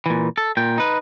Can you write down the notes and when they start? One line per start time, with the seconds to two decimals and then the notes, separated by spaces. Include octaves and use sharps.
0.06 A#2 E3
0.38 A4
0.57 A#2 G5
0.78 D#4 B4